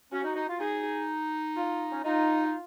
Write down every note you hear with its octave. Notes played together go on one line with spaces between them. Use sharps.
C#4 F#4
D#4
D#4
F4
D#4 G#4
F4
C#4
D#4 F4